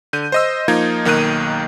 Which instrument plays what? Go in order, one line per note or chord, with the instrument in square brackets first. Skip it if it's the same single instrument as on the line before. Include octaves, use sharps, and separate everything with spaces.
[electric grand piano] D3 G6 D#7
C5 D#5 E6
F3 A#3 D#4 F4 G#6
B1 D#3 A#3 F#6 D#7